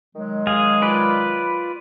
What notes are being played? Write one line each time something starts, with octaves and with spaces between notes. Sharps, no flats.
D#3 F#3 G#3
G#4 F5
F4 B4 D5